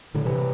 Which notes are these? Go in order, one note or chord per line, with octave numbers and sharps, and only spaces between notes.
A2 D3
C3 E3